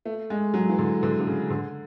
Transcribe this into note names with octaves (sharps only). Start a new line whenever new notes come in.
A3
G#3
F#3
E3
D3
D3
D3
C#3
D3